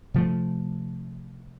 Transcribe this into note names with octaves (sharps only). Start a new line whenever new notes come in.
C3 F3 A3